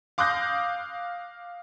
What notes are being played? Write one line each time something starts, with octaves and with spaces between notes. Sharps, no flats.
F5 D6 D#6 F#6 G6 A#6